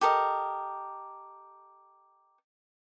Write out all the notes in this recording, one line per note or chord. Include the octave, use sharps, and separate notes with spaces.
G4 A4 A#4 D#5